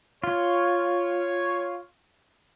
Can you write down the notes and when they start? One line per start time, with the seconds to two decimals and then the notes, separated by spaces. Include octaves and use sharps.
0.24 F4 C#5